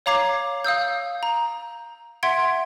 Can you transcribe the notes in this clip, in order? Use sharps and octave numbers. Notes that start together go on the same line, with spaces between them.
C#5 F5 A#5 D6 G#6 C7
F5 D#6 E6 G6
A#5
E5 F#5 C6 G#6 B6 D7